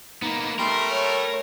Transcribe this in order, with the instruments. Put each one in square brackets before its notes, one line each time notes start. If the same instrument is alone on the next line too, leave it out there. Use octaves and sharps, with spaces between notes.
[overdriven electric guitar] A#3 B3 [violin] D#4
[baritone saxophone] G3 [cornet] A3 [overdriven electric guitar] A#4 [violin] C6
[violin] C#5